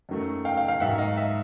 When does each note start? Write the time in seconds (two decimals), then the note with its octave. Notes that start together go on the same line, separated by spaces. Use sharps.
0.09 F#2 D#3 F#3 A3
0.45 F5 G5
0.57 F5 G5
0.68 F5 G5
0.80 G#2 D#3 F#3 E5 F#5
0.98 D#5 F5
1.17 E5